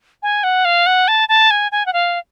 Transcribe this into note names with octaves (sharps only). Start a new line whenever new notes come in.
G#5
F#5
F5
F#5
A5
A5
G#5
G#5
F#5
F5